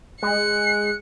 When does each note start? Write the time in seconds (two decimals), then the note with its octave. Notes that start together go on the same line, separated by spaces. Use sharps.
0.23 G#3 F#6 C#7